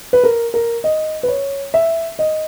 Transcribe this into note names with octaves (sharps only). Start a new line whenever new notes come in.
B4
A#4
A#4
D#5
B4
C#5
E5
D#5